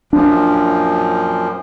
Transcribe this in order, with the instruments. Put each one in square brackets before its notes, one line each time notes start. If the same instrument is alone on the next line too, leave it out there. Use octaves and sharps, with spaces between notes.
[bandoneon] F#2 A#2 F3 [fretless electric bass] D4